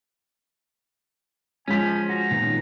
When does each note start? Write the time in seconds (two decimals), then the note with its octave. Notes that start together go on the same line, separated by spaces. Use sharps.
1.68 F3 G#3 C#4 G#5 B6
2.09 F#4 A#5
2.31 A#2 D#3 B3